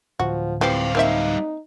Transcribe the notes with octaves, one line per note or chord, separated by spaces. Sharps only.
D1 F3 F#4
E3 F3 G3 C4 G4 F5
A#3 C4 D#4 E5